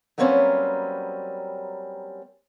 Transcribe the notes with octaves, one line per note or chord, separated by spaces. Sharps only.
F#3 G3 A#3 C4 C#4 B4